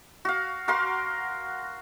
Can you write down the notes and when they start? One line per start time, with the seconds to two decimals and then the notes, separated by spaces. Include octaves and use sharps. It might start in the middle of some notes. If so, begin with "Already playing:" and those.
0.25 F#4 F5
0.68 F#4 A#4 F5 C6